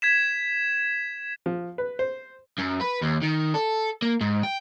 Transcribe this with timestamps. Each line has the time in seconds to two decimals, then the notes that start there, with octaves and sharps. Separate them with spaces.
0.02 G#6 B6 E7
1.46 F3
1.78 B4
1.99 C5
2.59 F#2
2.81 B4
3.01 D#2
3.22 D#3
3.54 A4
4.02 A#3
4.21 G#2
4.43 G5